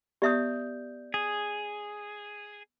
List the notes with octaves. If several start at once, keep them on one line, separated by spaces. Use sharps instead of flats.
B3 G4 D5 E5 D#6 G6
G#4